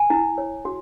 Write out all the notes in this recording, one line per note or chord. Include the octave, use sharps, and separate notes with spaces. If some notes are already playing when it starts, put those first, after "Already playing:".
Already playing: G#5
E4
C#5
F#4